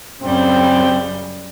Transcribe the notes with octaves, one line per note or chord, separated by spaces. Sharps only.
F#2 C#3 G3 C4